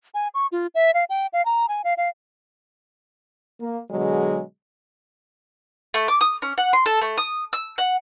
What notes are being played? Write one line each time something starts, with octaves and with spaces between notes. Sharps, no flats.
G#5
C#6
F4
E5
F5
G5
F5
A#5
G#5
F5
F5
A#3
B2 D3 F#3 G#3 G#4
A3
D6
D#6
C#4
F#5
C6
A4
A3
D#6
E6
F#5